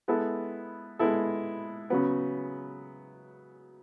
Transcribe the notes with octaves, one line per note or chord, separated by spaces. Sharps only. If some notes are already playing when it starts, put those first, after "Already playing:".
G#3 B3 E4 A4
G#3 B3 E4 A4
C#3 F#3 B3